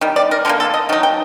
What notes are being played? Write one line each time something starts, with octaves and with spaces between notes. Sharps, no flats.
D#3 G3
D5
A#4
D3 G3 A#3 A#4
A4
D#5
D#3 F#3 D#4
G5